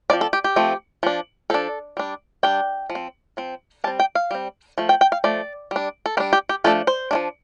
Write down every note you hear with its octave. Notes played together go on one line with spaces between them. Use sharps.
F3 A3 C4 D5
A4
G4
G4
F3 A3 C4
F3 D4
F3 D4 A4
G3 D4
G3 D4 G5
F3
C4
F3 C4
G3 C4 A5
G5
F5
G3 C4
F3 A3
G5
G5
F5
F3 A3 D5
G3 D4
A4
G3 D4 C5
G4
G4
F3 A3 D4 A4
C5
F3 A3 D4